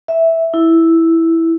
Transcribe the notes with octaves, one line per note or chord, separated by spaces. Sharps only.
E5
E4